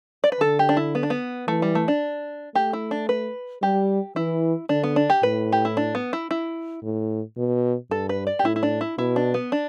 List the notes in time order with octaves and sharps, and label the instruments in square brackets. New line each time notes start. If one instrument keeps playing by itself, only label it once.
[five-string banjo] D5
B4
[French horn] D3 [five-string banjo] A4
[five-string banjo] G4
D4
E4
B3
D4
B3
[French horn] E3 [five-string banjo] A3
[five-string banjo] G3
A3
D4
[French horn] A3 [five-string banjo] G4
[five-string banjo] E4
D4
B4
[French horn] G3 [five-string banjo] G4
[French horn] E3 [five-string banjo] E4
[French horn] D3 [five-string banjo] D4
[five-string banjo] B3
D4
G4
[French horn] A2 [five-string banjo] B4
[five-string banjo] G4
E4
D4
B3
E4
E4
[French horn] A2
B2
[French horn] G2 [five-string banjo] A4
[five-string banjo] B4
D5
G4
[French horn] A2 [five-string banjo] E4
[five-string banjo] E4
D4
E4
[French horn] B2 [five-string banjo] E4
[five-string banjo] D4
B3
D4